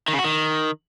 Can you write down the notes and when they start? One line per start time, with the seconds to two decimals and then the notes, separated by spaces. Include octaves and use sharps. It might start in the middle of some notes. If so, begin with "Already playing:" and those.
0.08 D#3
0.13 C#3
0.19 F#4
0.24 D#3